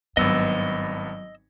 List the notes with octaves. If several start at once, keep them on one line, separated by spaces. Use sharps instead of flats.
G#1 G2 F#3 B3 D#5 E6